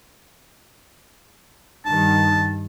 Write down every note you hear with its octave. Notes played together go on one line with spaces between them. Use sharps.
G2 D#3 A5